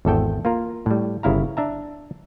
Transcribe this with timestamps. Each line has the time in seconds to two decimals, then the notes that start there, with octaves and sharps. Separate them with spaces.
0.05 G#1 E2 A4 G5
0.45 A#3 F4 A#4
0.86 A2 G3
1.23 G1 C#3 E4 F5 A#5
1.57 D4 E5 A#5